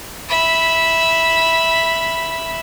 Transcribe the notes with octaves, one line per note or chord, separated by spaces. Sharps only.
E5 B5